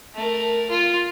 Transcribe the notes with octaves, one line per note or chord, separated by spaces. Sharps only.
A3 A#4
F4